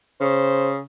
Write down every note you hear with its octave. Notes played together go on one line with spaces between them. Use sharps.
C#3 C5